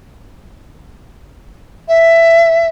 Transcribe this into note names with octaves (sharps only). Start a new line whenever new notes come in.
E5